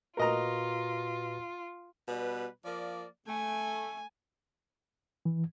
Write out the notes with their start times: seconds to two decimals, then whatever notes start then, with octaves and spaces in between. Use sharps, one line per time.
0.17 A#2 F4 F#4 A#4 B4 D#5 A#5
2.08 B2 G3 B4
2.65 F3 A#3 D5
3.28 A3 G#5
5.25 E3